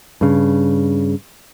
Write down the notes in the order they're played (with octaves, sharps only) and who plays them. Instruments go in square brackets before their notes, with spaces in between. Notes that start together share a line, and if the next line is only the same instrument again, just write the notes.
[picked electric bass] G2 C#3